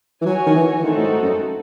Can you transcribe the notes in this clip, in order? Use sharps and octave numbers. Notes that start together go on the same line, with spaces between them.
E3
F#3 F#4 C#5 G#5
D#3
E3
E3
D#3 A3 C4 D#4 F#4 A4
A2
G#2
F#2